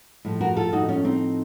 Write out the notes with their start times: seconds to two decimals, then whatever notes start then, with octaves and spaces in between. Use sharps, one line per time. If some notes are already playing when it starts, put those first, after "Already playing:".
0.25 A2 F3
0.41 F#4 A#4
0.56 F4 A4
0.73 D#4 F#4
0.89 C#4 F4
1.05 C4 D#4